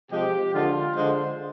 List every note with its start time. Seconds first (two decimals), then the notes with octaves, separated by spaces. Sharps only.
0.10 C3 F3 G#3 G4
0.53 D3 F3 G#3 F4
0.95 D3 G#3 C5